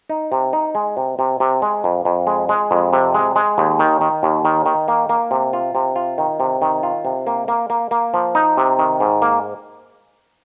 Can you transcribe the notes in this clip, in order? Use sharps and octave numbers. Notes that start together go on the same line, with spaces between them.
D#4
C3
D#4
G#3
C3
C3
C3
G#3
F2
F2
G#3
G#3
F2
C3
G#3
G#3
D#2
D#3
D#3
D#2
D#3
D#3
A#3
A#3
C3
F4
C3
F4
D#3
C3
D#3
F4
C3
A#3
A#3
A#3
A#3
F3
D#4
C3
D#3
G#2
A#3